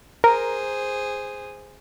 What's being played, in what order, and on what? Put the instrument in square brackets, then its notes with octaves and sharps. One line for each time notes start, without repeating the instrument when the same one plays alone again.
[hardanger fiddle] G#4 C5 [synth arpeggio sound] A#4